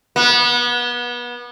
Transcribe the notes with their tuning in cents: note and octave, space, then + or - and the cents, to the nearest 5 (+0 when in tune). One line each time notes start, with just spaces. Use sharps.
B3 -30